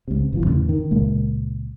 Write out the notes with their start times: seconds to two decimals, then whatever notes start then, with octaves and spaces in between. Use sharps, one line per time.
0.08 C#2 C3
0.33 G1 C3 E3 F3
0.44 E2 A2 C#3 E3
0.69 D#3
0.91 C#2 A#2 G#3 A#3